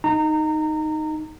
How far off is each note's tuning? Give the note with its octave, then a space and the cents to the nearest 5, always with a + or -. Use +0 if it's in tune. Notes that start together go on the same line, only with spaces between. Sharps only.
D#4 +0 A#5 -25